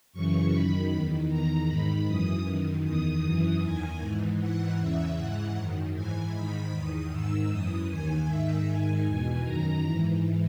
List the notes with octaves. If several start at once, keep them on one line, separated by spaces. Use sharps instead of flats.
F#2 C#3 E3 C#6
F#2 D#3 B5
E2 D#3
E2 D#3 A#5
G#2 D#3 B5
F#2 E3 D#6
F#2 D#3
E2 D#3 D#6
F#2 E3 D#6
E2 D#3 G#5
G#2 E3
G#2 E3 F#5
E2 C#3 E3 E5
G#2 E3 F#5
F#2 D#3
G#2 E3 G#5
G#2 D#3 B5
E2 D#3 D#6
G#2 D#3 E6
F#2 E3 D#6
D#2 D#3 G#5
G#2 D#3 E5
G#2 D#3 G#5
E2 B2 G#5
F#2 D#3 A#5
G#2 E3